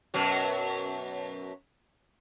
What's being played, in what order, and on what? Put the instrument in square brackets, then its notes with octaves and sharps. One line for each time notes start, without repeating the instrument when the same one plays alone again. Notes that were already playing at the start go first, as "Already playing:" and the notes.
[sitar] F#2 B2 F#3